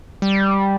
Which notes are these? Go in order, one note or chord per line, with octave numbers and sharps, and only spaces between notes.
G3